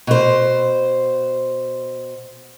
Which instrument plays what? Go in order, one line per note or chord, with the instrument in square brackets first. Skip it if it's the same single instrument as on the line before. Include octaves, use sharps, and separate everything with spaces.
[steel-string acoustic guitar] B2 C5